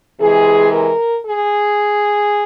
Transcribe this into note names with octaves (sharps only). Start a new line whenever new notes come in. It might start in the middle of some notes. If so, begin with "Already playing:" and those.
C3 E3 G#3 G#4
A#4
G#4